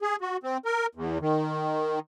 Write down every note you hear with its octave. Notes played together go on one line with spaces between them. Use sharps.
G#4
F#4
C4
A#4
E2
D#3